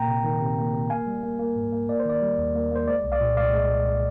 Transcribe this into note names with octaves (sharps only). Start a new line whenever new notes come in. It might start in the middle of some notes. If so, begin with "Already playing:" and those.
Already playing: A#2 A#3 G5 A#5
C3
D#3
C3
A#3
C3
A#3 F5 G#5
G3
A#3
A#3
G#2
A#3
A#3 D5
C5
D#3 D5
G3
D#2
A#3
A#3 C5
G#3 D5
C2
D5 F5
A#2
C2 D5 F5
G#3
G#3